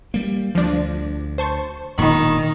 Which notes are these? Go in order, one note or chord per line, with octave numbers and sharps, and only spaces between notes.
G3 A#3
D2 F3 D4
C5 A5 C#6
E1 A#2 D#3 B5 C#6